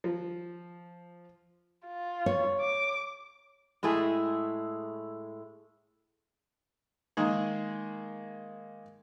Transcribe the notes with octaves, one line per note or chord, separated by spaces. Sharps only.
F3
F4
C#5
D6
A2 G#3 A3 E4 G#4
D#3 G#3 A#3 G#4